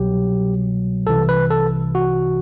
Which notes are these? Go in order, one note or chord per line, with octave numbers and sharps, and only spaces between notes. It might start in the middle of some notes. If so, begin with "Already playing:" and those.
Already playing: C2 B2 F#3 G4
C2 C3 E3 A4
B4
A4
F#4